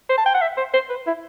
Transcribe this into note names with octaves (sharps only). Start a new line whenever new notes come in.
C5
A5
G5
F#5
E5
C5
C5
B4
E4